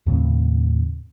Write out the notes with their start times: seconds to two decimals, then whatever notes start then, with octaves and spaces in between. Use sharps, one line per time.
0.06 D#2 A2 C#3 C4